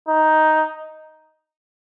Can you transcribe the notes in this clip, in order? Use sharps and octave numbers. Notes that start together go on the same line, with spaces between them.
D#4